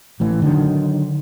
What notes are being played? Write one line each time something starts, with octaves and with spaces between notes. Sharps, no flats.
A1 A2 E3
D3 D#3 F#3